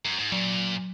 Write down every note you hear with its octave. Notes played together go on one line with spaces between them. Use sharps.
F#2
G#2
A#2 F#3